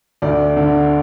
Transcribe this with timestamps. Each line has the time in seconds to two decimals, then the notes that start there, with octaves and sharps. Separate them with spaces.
0.22 D2 D5
0.57 D3